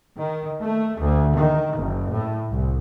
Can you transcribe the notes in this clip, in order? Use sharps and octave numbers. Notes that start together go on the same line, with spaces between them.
D#3
A3
D2
D#3
F#1
A2
C2